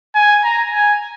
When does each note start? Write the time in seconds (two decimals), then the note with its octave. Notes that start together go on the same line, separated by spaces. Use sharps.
0.15 G#5
0.44 A#5
0.73 G#5